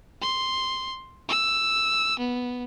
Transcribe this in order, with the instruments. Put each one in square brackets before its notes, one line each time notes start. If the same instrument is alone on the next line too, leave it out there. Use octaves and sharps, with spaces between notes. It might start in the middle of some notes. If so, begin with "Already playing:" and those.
[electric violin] C6
E6
B3